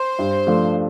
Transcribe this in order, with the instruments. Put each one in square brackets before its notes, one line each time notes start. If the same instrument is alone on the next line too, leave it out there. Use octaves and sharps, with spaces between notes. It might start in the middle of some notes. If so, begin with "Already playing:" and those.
Already playing: [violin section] C5
[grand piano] G2
F3 A3 D4